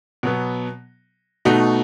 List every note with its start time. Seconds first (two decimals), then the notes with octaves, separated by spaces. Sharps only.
0.23 B2 F#3 B3
1.45 B2 A3 D#4 F#4